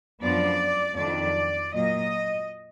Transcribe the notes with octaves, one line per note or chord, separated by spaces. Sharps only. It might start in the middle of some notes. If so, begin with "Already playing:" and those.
F#2 F3 B3 D4 F4 D5
F2 D#3 F#3 D4 D5
A#2 F#3 A#3 D#5